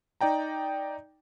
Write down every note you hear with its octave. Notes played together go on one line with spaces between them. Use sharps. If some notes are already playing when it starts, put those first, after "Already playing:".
D#4 D5 G5 A#5